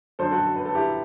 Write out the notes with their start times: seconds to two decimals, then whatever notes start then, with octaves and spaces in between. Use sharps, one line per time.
0.19 F#2 D3 F#3 A4 C5
0.31 F#4 A4
0.56 B4
0.65 A4
0.75 E4 G4